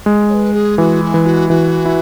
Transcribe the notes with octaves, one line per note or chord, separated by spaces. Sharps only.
G#3
C#5
B4
G#4
E3 F#4
E4
E3
F#4
E3 F#4
E4